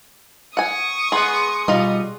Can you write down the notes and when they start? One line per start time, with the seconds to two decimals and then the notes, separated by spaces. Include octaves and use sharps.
0.57 F#5 G#5 C#6 D#6
1.12 G#3 B3 G#4 F#5 C6
1.68 B2 G3 D#4 F4 D#5